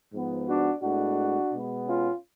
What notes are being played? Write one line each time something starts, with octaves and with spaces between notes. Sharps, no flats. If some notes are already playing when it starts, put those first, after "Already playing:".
G#2 F3 B3
D4 F#4
A2 G#3 B3 D4 F#4
B2 G#3 B3
C#4 F4